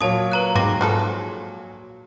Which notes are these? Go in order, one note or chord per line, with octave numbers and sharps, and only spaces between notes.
A#2 F#3 C#5 A5 D#6
B4 A#5 F#6
G#2 C4 A#5 D6 A#6
F3 G#3 A4